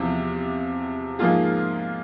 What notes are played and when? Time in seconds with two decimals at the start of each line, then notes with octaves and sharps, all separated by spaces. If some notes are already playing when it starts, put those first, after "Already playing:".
Already playing: E2 C3 F3
1.19 G#2 F3 A#3 F4 G#4